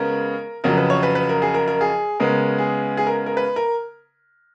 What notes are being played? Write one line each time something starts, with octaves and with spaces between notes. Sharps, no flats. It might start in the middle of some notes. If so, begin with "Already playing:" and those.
Already playing: C#3 G#3 B3 A#4
F2 C#3 F#3 A#4
B4
C#5
B4
B4
A#4
G#4
A#4
A#4
G#4
C#3 G#3 B3 A#4
G#4
G#4
A#4
A#4
B4
A#4